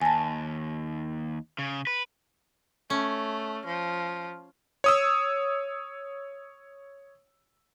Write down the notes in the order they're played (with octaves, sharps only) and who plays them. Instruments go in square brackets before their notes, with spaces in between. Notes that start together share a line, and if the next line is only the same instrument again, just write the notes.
[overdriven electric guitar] D#2 [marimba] G#5 A5
[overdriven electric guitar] C#3
B4
[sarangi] A3 [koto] C#4
[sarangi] F3
[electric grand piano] C#5 D#6 E6